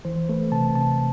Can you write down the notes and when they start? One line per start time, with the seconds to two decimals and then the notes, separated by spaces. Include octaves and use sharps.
0.05 E3 C5
0.29 A3 B4
0.52 C3 A5
0.75 C3 A5